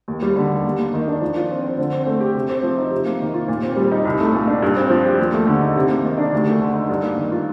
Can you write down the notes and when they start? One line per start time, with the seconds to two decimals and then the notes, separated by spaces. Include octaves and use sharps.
0.08 D#2
0.22 G3
0.36 D3
0.51 D#2
0.65 D#2
0.79 A#3
0.94 D#3
1.08 D4
1.22 F3
1.36 F4
1.51 C4
1.65 C5
1.78 D3
1.93 C4
2.07 A3
2.20 G4
2.35 C3
2.50 C4
2.63 F3
2.78 D#4
2.91 C3
3.06 A#3
3.21 D#3
3.34 F4
3.48 A#2
3.62 C4
3.77 G3
3.92 D#4
4.05 C2
4.20 A3
4.34 A#2
4.47 D4
4.62 G2
4.76 C4
4.90 F3
5.05 G4
5.19 D#2
5.34 A3
5.47 D3
5.62 D#4
5.76 C3
5.90 A#3
6.04 D#3
6.18 D4
6.33 D2
6.47 A3
6.61 D3
6.75 D#4
6.89 G2
7.03 A#3
7.18 D#3
7.32 F4